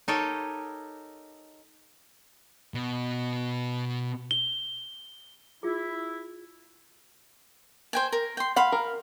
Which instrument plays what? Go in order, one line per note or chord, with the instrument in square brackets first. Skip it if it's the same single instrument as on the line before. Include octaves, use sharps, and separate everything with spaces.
[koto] D#4 G4 A4 A#4 C#5 D#5
[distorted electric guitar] B2
[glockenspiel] G7
[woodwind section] E4 [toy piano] F4 G#4
[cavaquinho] C5 G5 G#5
A#4
G5 C6
[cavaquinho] F5 B5 C6 [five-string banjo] F#5
[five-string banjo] A#4